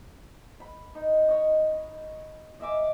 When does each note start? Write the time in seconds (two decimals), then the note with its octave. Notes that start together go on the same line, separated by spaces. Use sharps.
0.60 B5
0.95 D#4
1.28 C#5 D#5
2.60 D#5 E5 G#5 D6